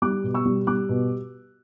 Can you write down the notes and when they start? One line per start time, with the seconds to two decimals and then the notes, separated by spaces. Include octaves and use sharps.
0.02 G3 D6 F#6
0.24 B2
0.34 C#6 E6
0.45 G3
0.67 G3 D6 F#6
0.89 B2